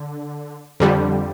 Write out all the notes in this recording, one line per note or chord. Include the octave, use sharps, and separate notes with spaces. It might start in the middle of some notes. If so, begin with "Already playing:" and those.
Already playing: D3
F2 D3 G3